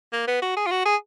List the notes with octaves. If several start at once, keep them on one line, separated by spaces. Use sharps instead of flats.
A#3
B3
F#4
G#4
F4
F#4
G#4